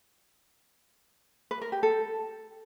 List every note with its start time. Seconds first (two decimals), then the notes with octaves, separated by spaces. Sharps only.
1.51 B4
1.61 A#4
1.72 G4
1.83 A4